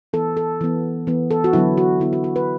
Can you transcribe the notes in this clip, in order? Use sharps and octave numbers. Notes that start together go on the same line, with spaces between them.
E3 B3 A4
A4
E3 B3
E3 B3
A4
F#4
D3 F#3 B3 E4
F#4
D3 B3 E4
F#4
F#4
B4